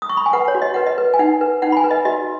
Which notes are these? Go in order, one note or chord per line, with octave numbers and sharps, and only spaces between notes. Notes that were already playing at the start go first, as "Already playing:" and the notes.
D#6
C#6
B5
G#5
B4 F#5
C#5
F#4
D#5
B4 F#5
D#5
B4
G#5
D#4 F#5
B4
D#4 F#5
B5
G#5
B4
D#5
F#4 D#5